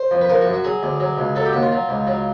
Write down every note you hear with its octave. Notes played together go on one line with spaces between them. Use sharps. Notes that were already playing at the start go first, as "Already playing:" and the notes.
Already playing: C5
F2
B4
F3 A#4
F#4
F#2
F#4
F#3 G#4
D2
F#3
C#2
F#3 A4
G4
D#2 F#4
F4
F#3
C#2
F#3